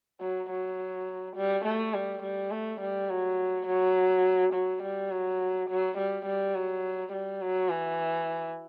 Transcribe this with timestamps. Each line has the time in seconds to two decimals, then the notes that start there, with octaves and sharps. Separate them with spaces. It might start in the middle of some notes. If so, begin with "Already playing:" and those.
0.21 F#3
0.50 F#3
1.36 G3
1.65 A3
1.94 G3
2.22 G3
2.51 A3
2.81 G3
3.10 F#3
3.67 F#3
4.53 F#3
4.83 G3
5.11 F#3
5.69 F#3
5.98 G3
6.26 G3
6.55 F#3
7.13 G3
7.42 F#3
7.70 E3